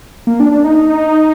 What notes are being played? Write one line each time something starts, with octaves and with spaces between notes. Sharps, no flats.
A#3
D4
D4
D#4